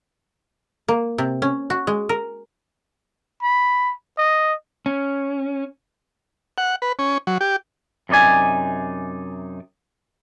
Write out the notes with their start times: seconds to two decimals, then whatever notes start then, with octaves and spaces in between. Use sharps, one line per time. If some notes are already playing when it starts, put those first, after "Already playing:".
0.88 A#3
1.18 C3
1.42 C#4
1.70 F#4
1.87 G#3
2.09 A#4
3.43 B5
4.18 D#5
4.86 C#4
6.58 F#5
6.82 B4
6.99 C#4
7.27 F#3
7.41 G4
8.09 F#2 C3 D#4 D5 G#5